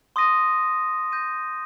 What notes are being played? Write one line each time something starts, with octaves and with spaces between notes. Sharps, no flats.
C6 D#6 A#6 D#7
G6 A#6 D#7